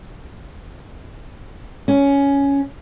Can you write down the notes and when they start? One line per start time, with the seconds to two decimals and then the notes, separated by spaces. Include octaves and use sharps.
1.88 C#4